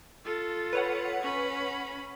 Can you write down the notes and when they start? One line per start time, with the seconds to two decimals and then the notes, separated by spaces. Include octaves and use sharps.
0.25 F4 A4
0.73 B4 C#5 F#5
1.22 C#4 B5